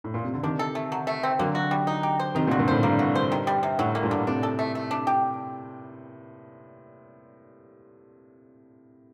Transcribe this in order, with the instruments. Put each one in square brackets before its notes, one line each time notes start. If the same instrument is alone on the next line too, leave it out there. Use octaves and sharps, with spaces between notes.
[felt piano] A2
A#2
C3
D3
[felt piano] C3 D#3 [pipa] D4
[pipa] A4
A3
F#3
A3
C4
[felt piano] D3 F#3 [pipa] A#3
[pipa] F#4
G3
D#4
G4
C5
[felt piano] C3 D#3 [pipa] D#4
[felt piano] A#2 D3 [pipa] F#4
[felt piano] G2 A#2
[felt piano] A2 [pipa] C5
[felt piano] G2 [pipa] A#3
[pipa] F#4
C5
D#3
G3
C3
[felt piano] A2 [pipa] F#3
[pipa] A#3
[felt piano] G2 A#2
[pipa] D3
[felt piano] A2 C3 [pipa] D4
[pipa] A4
A3
A3
D4
G4